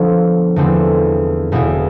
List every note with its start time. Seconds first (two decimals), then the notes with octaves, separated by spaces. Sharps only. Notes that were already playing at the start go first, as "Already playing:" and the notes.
Already playing: D3 F3 B3 D4 F4 A4
0.56 E2 D3 A3 C4 E4
1.52 E1 E2 B2 B3 E4